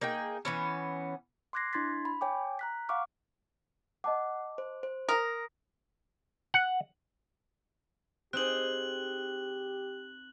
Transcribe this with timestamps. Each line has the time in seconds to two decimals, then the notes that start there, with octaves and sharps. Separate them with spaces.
0.01 A#3 D#4 G#4 G5
0.45 E3 B3 C#4
1.53 C6 D6 F#6 G#6 A#6 C7
1.73 D4 E4 C6 G#6 A6 B6
2.05 B5
2.21 C#5 G5 G#5 D6
2.59 A#5 F#6 B6
2.89 F5 F#5 C#6 D6 F6
4.04 D#5 F#5 A5 D6
4.58 C5
4.83 C5
5.09 A#4 D#6 A#6
6.54 F#5
8.33 C4 D#4 G4 G#4 F#6 F#7